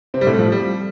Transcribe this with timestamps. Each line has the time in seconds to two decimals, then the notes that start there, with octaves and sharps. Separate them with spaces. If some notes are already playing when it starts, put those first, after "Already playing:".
0.14 C3 C4
0.21 G3
0.27 A2 A3
0.39 F3
0.52 G3